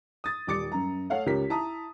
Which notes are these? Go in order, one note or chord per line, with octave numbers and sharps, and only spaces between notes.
D#6 A6
D#1 G3 D6 A6 C#7
F#2 A#5
A3 C#5 F5 F#5
C#2 G4 A#4 C#5 B6
E4 A5 A#5 D#6